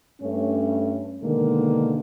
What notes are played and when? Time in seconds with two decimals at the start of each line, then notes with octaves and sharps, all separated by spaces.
0.21 G2 A3 C#4
1.22 B2 D3 D#3 G#3 A#3